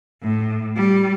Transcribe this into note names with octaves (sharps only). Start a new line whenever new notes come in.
A2
G3